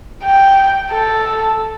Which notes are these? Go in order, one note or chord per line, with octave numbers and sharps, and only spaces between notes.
G5
A4